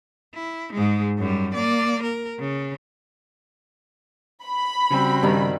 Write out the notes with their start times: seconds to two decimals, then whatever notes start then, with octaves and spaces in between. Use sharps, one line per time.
0.34 E4
0.73 G#2 G#3
1.18 F#2 G3
1.54 A#3 D5
2.02 A#4
2.39 C#3
4.45 B5
4.90 C#3 G3 C4 F#4
5.23 G2 D#3